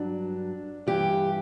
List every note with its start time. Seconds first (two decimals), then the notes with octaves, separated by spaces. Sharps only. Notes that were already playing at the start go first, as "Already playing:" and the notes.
Already playing: G2 F#3 D4
0.87 G2 E3 G4